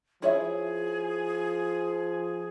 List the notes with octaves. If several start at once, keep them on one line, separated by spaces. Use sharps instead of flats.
F3 E4 G#4 C#5 E5